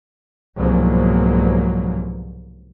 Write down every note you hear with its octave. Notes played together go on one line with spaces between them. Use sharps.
C2 G#2 B2 F3 F#3 A#3